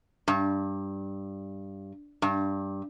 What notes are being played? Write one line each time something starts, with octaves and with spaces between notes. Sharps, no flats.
G2
G2